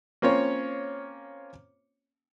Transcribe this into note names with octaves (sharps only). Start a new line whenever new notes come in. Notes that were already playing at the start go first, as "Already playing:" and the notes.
A#3 C4 C#4 F4 C#5